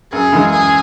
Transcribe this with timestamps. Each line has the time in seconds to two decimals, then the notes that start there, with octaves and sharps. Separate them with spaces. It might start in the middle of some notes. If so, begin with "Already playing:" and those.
0.12 F#2 G#4
0.32 C#3 E3 G#3
0.51 F#2 G#4